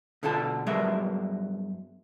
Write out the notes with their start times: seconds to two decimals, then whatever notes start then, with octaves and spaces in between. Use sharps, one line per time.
0.23 B2 D3 F4 A4 A5
0.66 G2 F#3 G#3 B3 A#4 E5